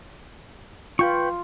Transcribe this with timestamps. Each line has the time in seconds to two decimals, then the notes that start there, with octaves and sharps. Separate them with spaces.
0.99 F4 B4 G5 C#6